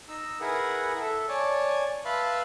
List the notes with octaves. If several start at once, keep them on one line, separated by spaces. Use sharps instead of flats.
D#4 E6
E4 G#4 A#4 B4 F#5
A4 E5
C#5 D5 G#5 A5
B4 E5 F5 A5 B5 C6